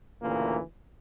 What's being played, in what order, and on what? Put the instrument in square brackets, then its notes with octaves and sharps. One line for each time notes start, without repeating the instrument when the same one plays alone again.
[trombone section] D2 A#2 C#3 E3 A#3